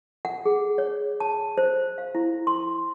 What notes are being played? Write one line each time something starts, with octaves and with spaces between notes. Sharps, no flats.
F#5
G#4
C#5
A5
C5
F5
E4
C6